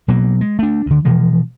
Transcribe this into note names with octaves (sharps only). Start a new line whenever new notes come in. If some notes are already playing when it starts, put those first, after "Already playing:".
B2 F#3 A#3
G#3
A3 D4
D2 D3
B2 E3 F3 G#3